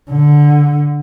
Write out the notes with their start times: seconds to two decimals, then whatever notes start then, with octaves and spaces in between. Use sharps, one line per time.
0.10 D3